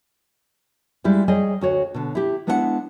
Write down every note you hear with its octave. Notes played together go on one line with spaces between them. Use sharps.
G3 G#3 E4 F4 G4
G3 G#4 C#5 D#5 G#5
D2 F#4 C#5
B2 D3
E4 G4
G#3 B3 D4 E4 C#5 F#5